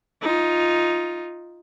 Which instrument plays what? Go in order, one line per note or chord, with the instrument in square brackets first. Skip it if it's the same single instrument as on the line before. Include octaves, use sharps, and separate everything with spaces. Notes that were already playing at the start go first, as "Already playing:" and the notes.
[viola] D#4 F4